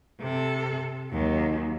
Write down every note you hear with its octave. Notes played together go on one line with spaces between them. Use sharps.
C3 A4
D#2 F#3